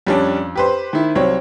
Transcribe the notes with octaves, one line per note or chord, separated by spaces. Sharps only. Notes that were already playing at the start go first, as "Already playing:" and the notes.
F2 G3 C#4 D4
G4 B4 C5
D#3 E4
C2 F#3 C4 C#5